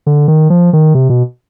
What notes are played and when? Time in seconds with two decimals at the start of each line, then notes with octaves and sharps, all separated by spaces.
0.06 D3
0.28 D#3
0.50 F3
0.73 D#3
0.95 C3
1.09 B2